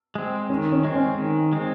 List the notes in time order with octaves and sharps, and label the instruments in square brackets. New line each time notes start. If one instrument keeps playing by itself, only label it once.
[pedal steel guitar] G#3 C4
[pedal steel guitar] D#3 [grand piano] C#4
[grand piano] C#4
[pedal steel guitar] G#3 C4
[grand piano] C#4
[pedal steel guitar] D#3
G#3 C4